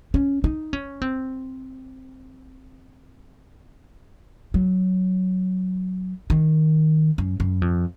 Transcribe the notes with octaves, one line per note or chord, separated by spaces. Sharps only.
C#4
D#4
C#4
C4
F#3
D#3
F#2
F#2
F2